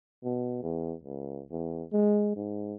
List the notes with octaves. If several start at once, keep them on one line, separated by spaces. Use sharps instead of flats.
B2
E2
C#2
E2
G#3
G#2